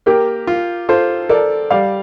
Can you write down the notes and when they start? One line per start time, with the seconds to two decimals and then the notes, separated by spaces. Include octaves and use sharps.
0.06 A#3 G4 A#4
0.47 F4
0.89 F4 A4 C5
1.29 A4 A#4 D5
1.70 G3 D5 F5